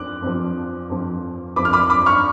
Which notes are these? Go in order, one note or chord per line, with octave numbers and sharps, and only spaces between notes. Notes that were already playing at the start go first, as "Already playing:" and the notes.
Already playing: F2 F3 D6 F#6
F2 F3
F2 F3
F2 F3 B5 D6
F6
B5 D6
B5 D6
C#6 F6